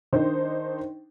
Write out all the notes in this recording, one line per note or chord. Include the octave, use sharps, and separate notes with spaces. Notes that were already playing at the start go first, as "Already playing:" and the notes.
D#3 D4 D#4 C5